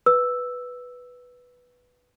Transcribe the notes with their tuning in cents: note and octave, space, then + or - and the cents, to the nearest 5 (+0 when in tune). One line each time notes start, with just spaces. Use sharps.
B4 +0 E6 +0